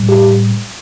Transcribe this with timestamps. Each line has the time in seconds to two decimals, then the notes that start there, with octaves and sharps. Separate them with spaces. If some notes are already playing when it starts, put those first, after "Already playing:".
Already playing: A2 G3
0.09 G4